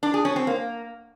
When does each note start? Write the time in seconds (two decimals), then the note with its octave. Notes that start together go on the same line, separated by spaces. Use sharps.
0.03 D4
0.14 G#4
0.25 C#4
0.36 C4
0.47 A#3